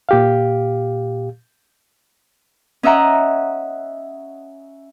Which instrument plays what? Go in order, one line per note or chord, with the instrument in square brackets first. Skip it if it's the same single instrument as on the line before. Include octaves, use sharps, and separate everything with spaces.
[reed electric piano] A#2 G4 F5
[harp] C#4 D#5 E5 F#5 A#5